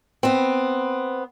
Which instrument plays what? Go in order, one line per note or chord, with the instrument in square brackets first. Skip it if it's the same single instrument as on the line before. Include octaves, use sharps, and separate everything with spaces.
[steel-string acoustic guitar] B3 C4